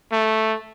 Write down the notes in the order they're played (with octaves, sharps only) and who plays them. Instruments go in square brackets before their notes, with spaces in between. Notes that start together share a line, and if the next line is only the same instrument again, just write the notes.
[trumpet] A3